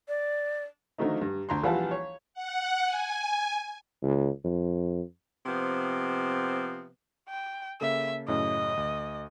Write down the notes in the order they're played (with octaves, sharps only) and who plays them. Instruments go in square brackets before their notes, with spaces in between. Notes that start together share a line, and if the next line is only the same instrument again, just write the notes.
[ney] D5
[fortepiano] D3 D#3 F3 F#3 A3 D#4
G2
D2 A#5 C6
A#1 E3 G3 F4 F#5 A5
C#5
[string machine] F#5
G#5
[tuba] C#2
F2
[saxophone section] C3 F3 B3 C4
[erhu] G5
[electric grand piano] C#3 A#3 A4 [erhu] E5
[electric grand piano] F#2 A2 C#3 [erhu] D#5
[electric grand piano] D2